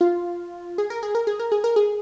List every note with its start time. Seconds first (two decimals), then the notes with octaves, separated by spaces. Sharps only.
0.01 F4
0.78 G#4
0.90 A#4
1.03 G#4
1.15 A#4
1.27 G#4
1.40 A#4
1.52 G#4
1.64 A#4
1.76 G#4